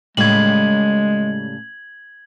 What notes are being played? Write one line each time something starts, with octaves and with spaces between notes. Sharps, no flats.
A2 C#3 G3 G#3 G#6 F#7